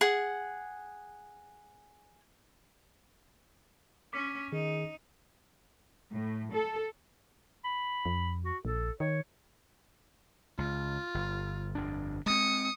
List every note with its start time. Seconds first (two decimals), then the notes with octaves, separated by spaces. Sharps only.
0.01 G#4 F#5
4.13 C#4 D6 B6
4.52 D#3 D#4 G#4
6.10 A2
6.51 A4
7.64 B5
8.06 F2
8.44 F#4
8.65 A#1 A4
9.00 D#3 C#5
10.58 C#2 F4
11.14 G1
11.75 G1 F2 D4
12.26 G#3 C4 D#6 C#7